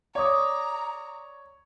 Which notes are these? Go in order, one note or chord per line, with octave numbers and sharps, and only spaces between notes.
C#5 D5 A#5 D6 D#6